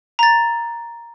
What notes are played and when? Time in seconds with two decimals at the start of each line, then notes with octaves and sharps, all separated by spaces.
0.19 A#5 A6